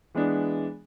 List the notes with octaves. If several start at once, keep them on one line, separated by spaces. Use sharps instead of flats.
E3 G#3 B3 D4